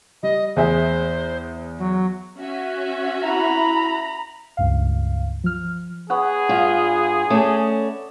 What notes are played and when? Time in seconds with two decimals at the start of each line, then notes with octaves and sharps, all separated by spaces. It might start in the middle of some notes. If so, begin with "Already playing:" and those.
0.23 G3 D#5
0.56 E2 G#4 C5 E5
1.78 F#3
2.39 C#4 F#4 E5
3.24 E4 A#5 B5
4.57 C#2 G2 F5
5.44 F3 F6
6.10 B3 G#4 C#5 F#5
6.49 G2 F4
7.30 A3 C#4 D5 A5